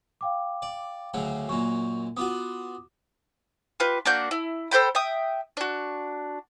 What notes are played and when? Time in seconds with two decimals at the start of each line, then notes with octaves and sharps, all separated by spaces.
0.21 F5 G5 D6
0.62 D5
1.14 D2 C#3 F#3
1.49 F#2 A#2 C#6
2.17 B3 F4 F#4 D6 D#6
3.80 F4 G4 B4
4.05 A#3 D4 F#4 G6
4.31 E4
4.71 A4 C5 G5 B5
4.95 E5 G5 D#6
5.57 D4 F#4